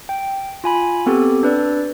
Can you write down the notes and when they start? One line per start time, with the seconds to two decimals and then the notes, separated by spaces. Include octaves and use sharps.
0.09 G5
0.64 F4 G#5 B5
1.06 B3 C4 G4 A4
1.43 D4 B4 D5